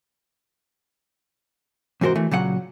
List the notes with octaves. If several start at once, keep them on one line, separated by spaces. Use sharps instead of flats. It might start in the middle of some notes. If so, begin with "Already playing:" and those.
E2 G#2 C3 F#4 A#4 C5
E3 A3
A#2 C#3 F#3 F#5